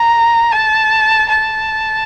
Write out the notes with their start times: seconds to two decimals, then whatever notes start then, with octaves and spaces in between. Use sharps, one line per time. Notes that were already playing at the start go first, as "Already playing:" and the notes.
Already playing: A#5
0.51 A5
1.29 A5